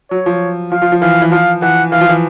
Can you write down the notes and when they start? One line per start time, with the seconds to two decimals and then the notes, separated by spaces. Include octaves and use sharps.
0.11 F#3 C#5
0.26 F3
0.72 F3 F5
0.82 F3
0.92 F3
1.02 E3 F5
1.22 E3
1.32 F3 F5
1.62 E3 F#5
1.92 E3 F5
2.01 F3
2.09 E3